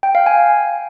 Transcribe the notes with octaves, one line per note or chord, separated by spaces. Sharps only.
G5
F5
G#5